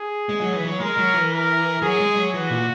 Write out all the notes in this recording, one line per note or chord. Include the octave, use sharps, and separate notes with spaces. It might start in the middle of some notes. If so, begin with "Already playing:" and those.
Already playing: G#4
G#3
F#3
E3
F#3
G#3 A#4
F#3
E3
A#4
F#3 G#4
G#3
F#3
E3 F#4
A#2